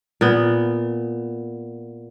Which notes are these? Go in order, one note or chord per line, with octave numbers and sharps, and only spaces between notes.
A#2 B3